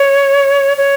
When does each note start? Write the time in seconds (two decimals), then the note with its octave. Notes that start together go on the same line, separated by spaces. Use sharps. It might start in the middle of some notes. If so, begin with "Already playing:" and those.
Already playing: C#5
0.77 C#5